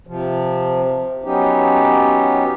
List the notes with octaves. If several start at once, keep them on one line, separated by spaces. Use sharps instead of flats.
C3 F3
F#3 B3 C#4 D#4 G4